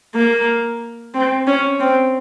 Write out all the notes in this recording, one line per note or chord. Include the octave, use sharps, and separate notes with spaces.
A#3
C4
C#4
C4